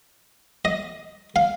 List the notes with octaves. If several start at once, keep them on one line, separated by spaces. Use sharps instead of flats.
D#5
F5